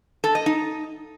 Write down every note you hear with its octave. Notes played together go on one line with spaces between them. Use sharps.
A4
D#5
D#4